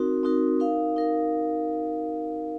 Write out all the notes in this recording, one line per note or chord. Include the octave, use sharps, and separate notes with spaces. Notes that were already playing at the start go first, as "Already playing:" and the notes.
Already playing: C4 D#4 F#4 A#4
C4 D#4 F#4 A#4
D#4 A#4 F5
D#4 A#4 F5